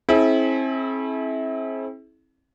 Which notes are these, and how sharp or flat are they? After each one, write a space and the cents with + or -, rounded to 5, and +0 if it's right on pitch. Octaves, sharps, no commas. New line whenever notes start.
C4 +30 E4 -25 G#4 +40